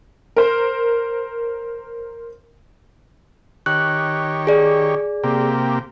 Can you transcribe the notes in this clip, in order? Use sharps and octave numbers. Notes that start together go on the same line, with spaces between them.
A#4 C5
D#3 G4 C#5 F#6
G#4 D5
C3 A#3 G4